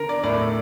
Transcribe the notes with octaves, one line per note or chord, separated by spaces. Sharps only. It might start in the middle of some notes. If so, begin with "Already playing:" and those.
Already playing: D3 A#4
D5
A2 A3 D5